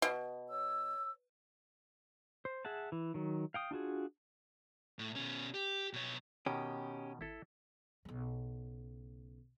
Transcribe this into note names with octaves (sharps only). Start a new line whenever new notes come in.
B2
C#5 E6
C5
G#4 E5 F#5 A5
E3
D#3 F#3
F5 G5 D#6
D4 F4 F#4 G#4
A2
B2 C#4
G4
B2 C#5
B2 D#3 C#4 G4
G#1 E4 A4
B1 C#3